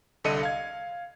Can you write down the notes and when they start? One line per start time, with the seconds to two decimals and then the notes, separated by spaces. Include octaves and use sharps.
0.24 C2 D3 A4 D#5 C#7 D#7
0.43 F5 G#6